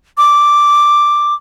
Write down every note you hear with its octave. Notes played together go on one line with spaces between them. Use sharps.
D6